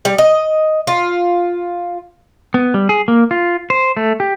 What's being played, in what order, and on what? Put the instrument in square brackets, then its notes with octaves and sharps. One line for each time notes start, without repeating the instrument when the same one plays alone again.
[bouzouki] G3
D#5
F4
[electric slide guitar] B3
G3
G#4
A#3
F4
C5
A3
G4